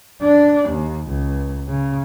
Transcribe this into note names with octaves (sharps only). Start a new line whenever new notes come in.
D4
D#2
C#2
C#3